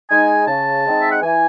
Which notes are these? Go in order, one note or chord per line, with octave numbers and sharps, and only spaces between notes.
G#3 D#4 G#5
C#3 A5
G#3 C4 D#4
E5
F#5
E3 G#5